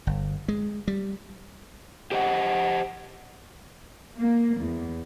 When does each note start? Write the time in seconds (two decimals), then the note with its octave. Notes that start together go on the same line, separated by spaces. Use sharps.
0.07 G1
0.48 G#3
0.88 G3
2.12 G4 C5 D#5 F#5
4.17 A#3
4.58 E2